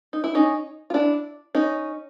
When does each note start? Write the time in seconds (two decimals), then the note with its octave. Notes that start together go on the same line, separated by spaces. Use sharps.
0.13 D#4
0.24 E4
0.35 C#4 D#4
0.90 F4
0.94 D4 E4
1.55 C#4 D#4